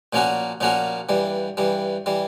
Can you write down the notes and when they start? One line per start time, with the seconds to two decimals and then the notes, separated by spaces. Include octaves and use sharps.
0.13 A#2 F3 A#3 C#4 F#4
0.61 A#2 F3 A#3 C#4 F#4
1.09 G2 E3 G3
1.57 G2 E3 G3
2.06 E3 G3